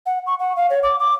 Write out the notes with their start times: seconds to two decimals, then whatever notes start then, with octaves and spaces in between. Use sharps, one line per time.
0.06 F#5
0.27 C#6
0.39 F#5
0.56 F5
0.70 C#5
0.83 D6
0.99 D6